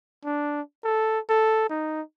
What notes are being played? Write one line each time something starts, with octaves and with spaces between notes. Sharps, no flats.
D4
A4
A4
D#4